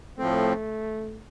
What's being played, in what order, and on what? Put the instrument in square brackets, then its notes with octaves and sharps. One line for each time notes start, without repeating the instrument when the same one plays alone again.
[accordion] A2 F3 C4 [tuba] A3